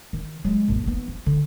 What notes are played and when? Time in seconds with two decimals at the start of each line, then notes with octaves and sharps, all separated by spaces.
0.13 D#3
0.44 F#3 G#3
0.68 A#1 F#2
0.84 D#2 B3
1.08 F3
1.26 D3